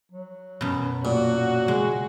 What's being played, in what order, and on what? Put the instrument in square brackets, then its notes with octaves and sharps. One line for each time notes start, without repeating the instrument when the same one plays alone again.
[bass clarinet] F#3
[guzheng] F#2 B2
[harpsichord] A#2 [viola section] F#4
[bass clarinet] C#3 [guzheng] G#3